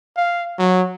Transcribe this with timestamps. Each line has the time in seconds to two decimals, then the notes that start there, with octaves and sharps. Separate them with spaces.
0.17 F5
0.59 F#3